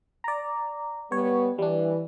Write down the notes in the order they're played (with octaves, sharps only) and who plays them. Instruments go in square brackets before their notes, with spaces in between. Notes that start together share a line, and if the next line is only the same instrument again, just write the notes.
[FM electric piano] D5 A#5
[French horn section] G3 B3 [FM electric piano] C#5
[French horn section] E3 [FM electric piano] G3 D4